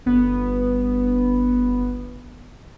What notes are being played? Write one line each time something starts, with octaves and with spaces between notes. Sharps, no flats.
G1 B3